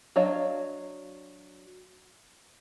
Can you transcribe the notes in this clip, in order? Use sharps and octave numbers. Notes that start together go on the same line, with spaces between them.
F#3 D4 C#5 D#5 F5